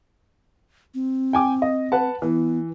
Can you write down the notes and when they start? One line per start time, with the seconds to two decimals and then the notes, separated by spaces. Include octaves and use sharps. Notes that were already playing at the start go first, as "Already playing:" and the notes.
0.94 C4
1.33 G5 G#5 D6
1.62 D#5
1.92 B4 F#5 A5
2.22 E3 B3